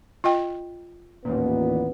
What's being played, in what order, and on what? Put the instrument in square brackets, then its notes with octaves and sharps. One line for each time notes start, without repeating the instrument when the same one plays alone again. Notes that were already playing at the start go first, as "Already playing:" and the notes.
[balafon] F4 D#5 G5
[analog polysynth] A1 D#2 A#2 [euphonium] B3